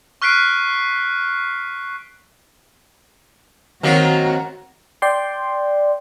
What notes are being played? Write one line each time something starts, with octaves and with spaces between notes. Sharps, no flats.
C#6 F6 F#6 B6 C7 D7
D#3 F#3 A#3 C4 F#4
D5 G5 C6